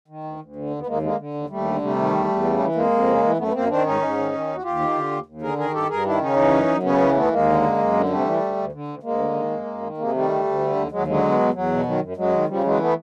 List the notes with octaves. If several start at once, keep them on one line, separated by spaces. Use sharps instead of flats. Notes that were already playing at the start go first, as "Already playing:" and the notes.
D#3
D2
D2
D3
D#2
B3
D#2 G#3 A#3
D3 G#3 A#3
D3
D#2
D#2 G3 A3
D3
C3 G3 A3
D#3
E2
E2
C#3
E3
F2 G#3 A#3
F2
C#3
E3
F#2 A3 B3
B3
F#2 A#3 C4
D#3 C4 D4
G#2 C#4 D#4
G#2
D#3
D#3
D#2
F#4
D#2 F4 G4
D#3
D3
D#2
D#2
D3 G#4 A#4
D#3 G#4 A#4
G2 G4 A4
G2 G#4 A#4
D#3 D4 E4
C#3 C#4 D#4
E3
F#2
F#2
C#3 B3 C#4
E3
D#2 A3 B3
D#2 G#3 A#3
D3
F#2
F#2
D3
C3 G3 A3
E3
D2
D2
D3
D2
D2 G#3 A#3
D3
D#3
F#2
F#2
D#3
C3 G#3 A#3
D#3 G3 A3
D2
D2
D3
D#2
D#2 F#3 G#3
D3 F#3 G#3
B2
E2
E2 F#3
B2
D#3 F#3
F#2
F#2 F#3 G#3
D#3
C#3 F3 G3
E3 F#3 G#3
A3 B3